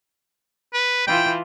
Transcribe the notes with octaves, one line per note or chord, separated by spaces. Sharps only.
B4
E3 E4 F4 G5